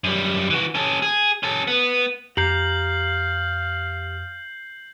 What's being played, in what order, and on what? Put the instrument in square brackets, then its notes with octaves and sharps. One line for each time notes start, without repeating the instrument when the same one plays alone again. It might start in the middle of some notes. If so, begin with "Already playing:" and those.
[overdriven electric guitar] F#2 G3
E3 F#4
C#4 A4
G#4
C#4 A4
B3
[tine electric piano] F2 [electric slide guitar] G4 A#5 [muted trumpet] F5 [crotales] G6 C7 F#7